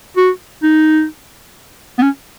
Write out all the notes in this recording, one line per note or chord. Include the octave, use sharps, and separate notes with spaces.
F#4
D#4
B3
C#4